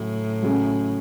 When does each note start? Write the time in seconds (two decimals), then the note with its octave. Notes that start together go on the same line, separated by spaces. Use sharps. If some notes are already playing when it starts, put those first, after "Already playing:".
Already playing: A2 C#3 F#3 C#4
0.42 C#3 F#3 C#4 G#4